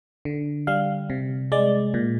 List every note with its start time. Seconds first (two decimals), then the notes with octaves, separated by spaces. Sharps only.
0.25 D3
0.67 G3 F5
1.10 C3
1.52 G#3 D5
1.94 A#2